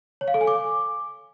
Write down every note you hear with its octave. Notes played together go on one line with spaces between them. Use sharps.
C#5
F5
A4
G#5
D6